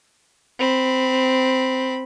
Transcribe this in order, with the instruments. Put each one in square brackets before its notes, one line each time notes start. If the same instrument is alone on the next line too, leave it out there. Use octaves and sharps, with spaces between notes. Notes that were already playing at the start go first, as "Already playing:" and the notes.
[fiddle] C4 B5